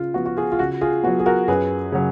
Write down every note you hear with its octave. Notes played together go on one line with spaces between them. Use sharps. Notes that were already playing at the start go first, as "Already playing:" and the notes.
Already playing: C#3 F4
F3 B3 F#4
F#4
F4 G#4
F4
C#3 F#4
F4 G#4
F#3 B3 F#4
G#4
F#4 A#4
F#2 G#4 B4
C#3 F#3